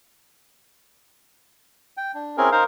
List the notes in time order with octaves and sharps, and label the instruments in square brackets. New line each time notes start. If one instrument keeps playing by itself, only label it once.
[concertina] G5
D4
C4 C#4 E4 G#4 A#4
D#4 A#4 C5 F5